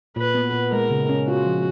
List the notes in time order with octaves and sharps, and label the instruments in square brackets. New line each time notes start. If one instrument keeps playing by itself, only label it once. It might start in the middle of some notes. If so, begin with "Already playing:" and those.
[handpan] A#2 [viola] B4
[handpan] B3
A#2
[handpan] G#3 [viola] A#4
[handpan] C#3
C#4
[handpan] F4 [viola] F#4
[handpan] F3